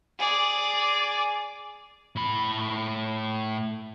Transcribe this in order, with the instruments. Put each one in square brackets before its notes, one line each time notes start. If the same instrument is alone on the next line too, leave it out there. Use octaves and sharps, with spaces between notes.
[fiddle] G#4 D5
[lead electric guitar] A2 B5